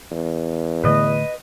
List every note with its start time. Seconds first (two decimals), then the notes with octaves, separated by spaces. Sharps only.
0.11 E2
0.84 A2 D3 A3 B4 D#5